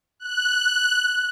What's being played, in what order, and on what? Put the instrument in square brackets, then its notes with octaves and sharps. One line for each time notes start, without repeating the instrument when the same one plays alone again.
[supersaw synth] F#6